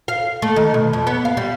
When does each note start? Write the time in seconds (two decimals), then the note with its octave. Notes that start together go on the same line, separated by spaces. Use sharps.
0.08 F5
0.42 A3
0.56 D#3
0.74 B2
0.93 F2
1.07 B3
1.25 F5
1.37 G3